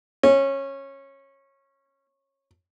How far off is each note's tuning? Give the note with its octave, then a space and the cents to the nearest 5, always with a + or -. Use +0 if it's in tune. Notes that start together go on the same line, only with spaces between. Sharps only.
C#4 -20